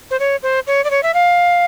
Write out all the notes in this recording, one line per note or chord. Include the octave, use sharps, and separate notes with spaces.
C5
C#5
C5
C#5
D5
C#5
E5
F5